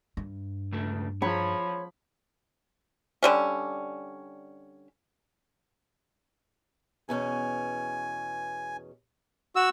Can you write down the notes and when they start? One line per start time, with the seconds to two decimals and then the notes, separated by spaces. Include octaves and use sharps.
0.17 G2
0.72 C#2 A3
1.22 F3 C#5 B5
3.23 D3 G3 C#4
7.09 E2 B2 C#4 G#5
9.56 F#4 E6